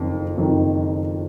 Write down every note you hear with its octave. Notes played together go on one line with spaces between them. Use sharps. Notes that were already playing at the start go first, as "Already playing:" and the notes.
Already playing: F#1 F2 D#3
F#1 F2 D#3